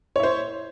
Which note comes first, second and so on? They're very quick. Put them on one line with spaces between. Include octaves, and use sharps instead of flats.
C#5 E4 C5